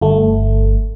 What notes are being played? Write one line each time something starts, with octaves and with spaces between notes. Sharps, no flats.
G1 A3